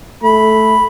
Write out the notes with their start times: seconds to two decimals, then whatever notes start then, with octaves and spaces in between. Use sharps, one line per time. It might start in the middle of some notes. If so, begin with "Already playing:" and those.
0.23 A3 B5